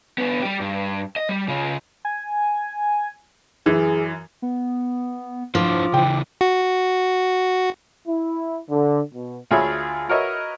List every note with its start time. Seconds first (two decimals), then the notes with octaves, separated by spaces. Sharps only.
0.18 B3 D4
0.42 G3 G4
0.60 G2
1.16 D#5
1.29 G3
1.48 C#3 F4
2.05 G#5
3.66 F#2 E3 G#4
4.42 B3
5.55 F3 D4 E4 C5 D6
5.94 C#3 E3 G5
6.41 F#4
8.08 E4
8.70 D3
9.13 B2
9.51 D2 F4 G#4 C#5 E5 B5
10.09 F#4 A#4 B4 C#5 D#5 E5